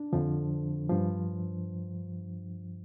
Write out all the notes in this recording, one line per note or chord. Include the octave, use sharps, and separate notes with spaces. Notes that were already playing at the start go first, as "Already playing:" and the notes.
Already playing: D4
F2 D3 F3
G2 F3